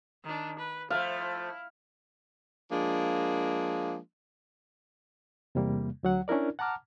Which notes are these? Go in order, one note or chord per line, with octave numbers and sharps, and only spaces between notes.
D#3 D4
B4
F3 A3 E4 F5
F3 G#3 A#3 D4
E2 C3 G3 A#3
D2 F#3 F#5
C#4 D4 E4 A#4 D5
F#5 A5 A#5 D6 F6